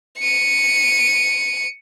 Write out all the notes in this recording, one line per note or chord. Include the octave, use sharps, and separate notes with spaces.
C#7 D#7